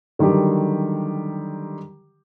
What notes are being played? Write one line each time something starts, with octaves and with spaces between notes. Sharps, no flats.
D3 D#3 F#3 G3 G4